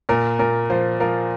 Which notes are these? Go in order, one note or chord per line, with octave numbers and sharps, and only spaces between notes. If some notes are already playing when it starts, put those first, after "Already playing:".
A#2 A#4
A#2 A#4
F3 C5
F3 A#4